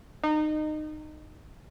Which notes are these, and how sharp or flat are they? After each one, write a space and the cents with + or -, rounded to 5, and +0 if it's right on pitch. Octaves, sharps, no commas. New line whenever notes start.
D#4 -25